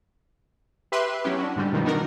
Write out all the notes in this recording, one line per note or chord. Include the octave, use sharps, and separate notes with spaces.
G4 B4 E5 C6
F#3 B3 C#4 E4 G4
D4 F#4
G#2 D3 G3
G2 B2 D#3 F3 G3
B3 D4 D#4 F#4 A#4